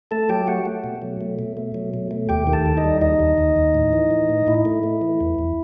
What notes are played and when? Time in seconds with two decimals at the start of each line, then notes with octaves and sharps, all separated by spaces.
0.11 A3 A4 A5
0.29 F#3 G4 G5
0.47 A3 F#4 F#5
0.66 A3
0.84 B2
1.02 F#3
1.21 A3
1.39 B2
1.57 A3
1.74 F#3
1.94 B2
2.11 A3
2.29 D#2 G4 G5
2.47 D#3
2.53 A4 A5
2.66 D#2
2.77 D#4 D#5
2.84 G3
3.01 D#2 D#4 D#5
3.20 D#2
3.38 D#2
3.56 D#2
3.75 A2
3.93 E3
4.11 E3
4.29 A2
4.47 A2 E4
4.65 A3
4.83 A3
5.01 E3
5.21 E2
5.39 E2